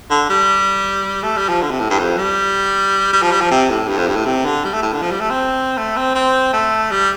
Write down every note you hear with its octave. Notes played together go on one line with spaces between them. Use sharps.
D3
G3
A3
G3
F3
D3
C3
A2
G2
F2
G3
G3
F3
G3
F3
C3
A2
G2
F2
G2
A2
C3
D3
G3
A3
A2
D3
F3
G3
A3
C4
A3
C4
C4
A3
G3